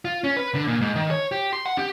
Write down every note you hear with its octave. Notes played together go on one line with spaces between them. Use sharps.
F4
C#4
B4
D3
A#2
G#2
D#3
C#5
G4
C6
F#5
G4